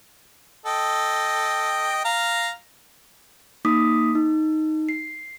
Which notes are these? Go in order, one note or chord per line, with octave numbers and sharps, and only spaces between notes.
A4 D#5 G5
F5 A#5
A#3 D#4 D6 D#6 B6
D#4
C7